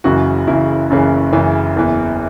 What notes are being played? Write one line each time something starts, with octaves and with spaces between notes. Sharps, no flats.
F#1 F#2 C#3 E3 F#4
F#1 F#2 C#3 E3 E4
F#1 F#2 C#3 E3
F#1 F#2 C#3 E3
F#1 E2 E3